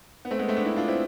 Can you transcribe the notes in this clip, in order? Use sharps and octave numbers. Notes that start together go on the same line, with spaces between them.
B3
A3 C4
G#3 B3
A3 C4
B3 D4
C4 E4
D4 F4
C4 E4